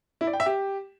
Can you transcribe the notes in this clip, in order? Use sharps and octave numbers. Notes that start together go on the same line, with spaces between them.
E4
D5
G5
E5
G4